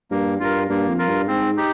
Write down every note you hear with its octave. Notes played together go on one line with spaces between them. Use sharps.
G2 A#3
G2 F4 A#4
G2 A#3
F2
F4 A#4
G2
G#2 C4
D#4 G4